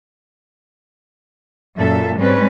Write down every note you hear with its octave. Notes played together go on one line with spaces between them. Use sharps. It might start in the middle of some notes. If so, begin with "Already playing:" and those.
F#2 A#2 A4 E5
G#2 G3 C4 C#4 B4